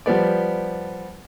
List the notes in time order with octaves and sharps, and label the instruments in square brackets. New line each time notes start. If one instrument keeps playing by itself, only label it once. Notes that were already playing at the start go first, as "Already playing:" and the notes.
[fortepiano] F3 G3 B3 D5